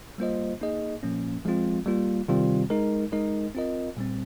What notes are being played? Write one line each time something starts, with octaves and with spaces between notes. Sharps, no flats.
G3 A#3 F4 C5 D#5
A#3 D#4 G#4 D#5
A#2 F3 A#3 C#4
F3 G#3 C4 F4
G3 A#3 F4
C3 D#3 G3 C4 F4
G#3 D#4 A#4
G#3 D#4 A#4 D#5
C4 F4 A#4 D#5
A#2 G3 C4